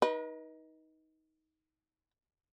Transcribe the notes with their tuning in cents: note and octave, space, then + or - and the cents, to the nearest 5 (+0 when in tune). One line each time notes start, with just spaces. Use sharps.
D#4 +20 B4 -40